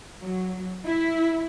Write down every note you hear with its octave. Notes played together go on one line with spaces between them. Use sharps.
F#3
E4